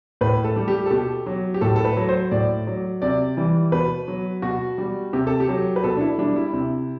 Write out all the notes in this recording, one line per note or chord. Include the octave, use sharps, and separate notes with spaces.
A2 B4
A4
G3
G4
A4
B2 G4
F#3
G4
A2 A4
A4
B4
F#3
C5
A2 D5
F#3
C3 D5
E3 G3
B2 B4
F#3
B2 F#4
G3
C3 G4
A4
G4
F#3
B4
B2 A4
D4
E4
G3 D4
E4
C3